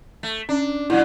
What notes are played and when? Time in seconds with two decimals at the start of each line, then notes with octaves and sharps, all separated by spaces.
0.23 A3
0.49 C#4 D4
0.90 A#2 F#3 E4